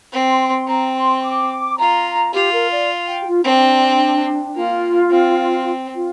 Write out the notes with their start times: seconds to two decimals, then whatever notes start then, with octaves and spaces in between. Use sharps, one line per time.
0.12 C4
0.30 C6
0.48 C6
0.67 C4 A#5
0.95 C6
1.23 D6
1.78 F4 A#5
2.33 F4 G4
2.52 A#4
2.70 D5
3.07 G5
3.22 G4
3.26 F4
3.44 C4 D4
4.55 A#3 F4
5.10 C4
5.95 F4